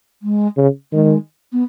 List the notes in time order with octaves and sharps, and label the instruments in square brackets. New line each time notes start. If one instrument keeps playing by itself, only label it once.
[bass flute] G#3
[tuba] C#3
[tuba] D#3 [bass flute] G#3
[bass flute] B3